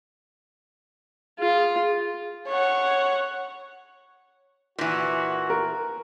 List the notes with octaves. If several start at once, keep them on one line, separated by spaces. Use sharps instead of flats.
F4 G#4
C#5 F#5
A#2 E3 F#4
A#4